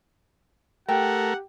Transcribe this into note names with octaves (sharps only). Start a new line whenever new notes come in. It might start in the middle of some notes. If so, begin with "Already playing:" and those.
A3 G4 A#4 F#5 G5